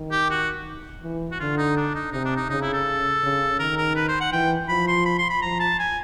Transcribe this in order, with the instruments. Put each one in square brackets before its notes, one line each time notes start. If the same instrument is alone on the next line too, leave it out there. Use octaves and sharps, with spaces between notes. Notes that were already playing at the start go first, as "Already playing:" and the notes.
Already playing: [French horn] D#3
[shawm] G4
F#4
[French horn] E3
[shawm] F#4
[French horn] D3 [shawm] F4
[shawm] D#4
D4
D#4
[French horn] C3 [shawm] D#4
[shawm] D4
D#4
[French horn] C#3 [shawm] D#4
[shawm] E4
A4
[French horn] C#3
[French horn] D#3 [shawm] A#4
[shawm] A#4
B4
C5
F#5
[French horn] E3 [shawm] G5
[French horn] F3 [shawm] B5
[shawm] C6
B5
C6
B5
[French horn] F3 [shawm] A#5
[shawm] A5
G#5